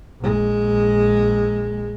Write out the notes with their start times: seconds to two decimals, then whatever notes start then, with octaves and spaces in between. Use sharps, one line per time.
0.20 A#1 G#3